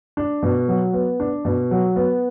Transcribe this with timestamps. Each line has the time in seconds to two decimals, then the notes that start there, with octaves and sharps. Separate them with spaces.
0.17 D4
0.43 B2
0.68 F#3
0.93 B3
1.20 D4
1.45 B2
1.71 F#3
1.96 B3